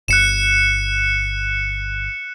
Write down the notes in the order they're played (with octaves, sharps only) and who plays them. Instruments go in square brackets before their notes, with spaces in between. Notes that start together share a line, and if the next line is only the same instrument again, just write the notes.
[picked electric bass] G1 [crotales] F#6 C#7 E7